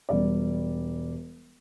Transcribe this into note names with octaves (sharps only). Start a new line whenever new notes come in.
E1 G3 D5